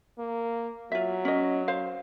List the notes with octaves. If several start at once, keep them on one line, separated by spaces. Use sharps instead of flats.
A#3
F#3 F4 E5
C#4 D#5
C5 F5